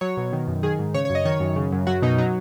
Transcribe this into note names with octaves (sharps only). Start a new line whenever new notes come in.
F#3 C#5
B2
D#3
F#2
D#3 G#4
G#2
C#3 C#5
C#5
F#2
D#5
D#3 C#5
F#2
C#3
F#2
F#3 F#4
B2 D#4
F#3 D#4